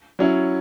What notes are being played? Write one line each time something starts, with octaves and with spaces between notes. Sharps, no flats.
F#3 C#4 E4